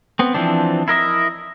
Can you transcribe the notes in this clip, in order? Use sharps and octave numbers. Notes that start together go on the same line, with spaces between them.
B3 C4
E3 F3 C4 D4
E4 A#4 D#5 E5